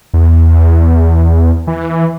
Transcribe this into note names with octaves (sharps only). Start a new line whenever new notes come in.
E2
E3